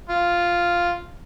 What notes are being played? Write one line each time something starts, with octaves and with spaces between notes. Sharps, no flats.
F4